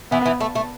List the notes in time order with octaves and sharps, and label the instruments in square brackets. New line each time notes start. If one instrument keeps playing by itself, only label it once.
[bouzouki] E3 [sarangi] B3
[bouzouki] E3
A3
A3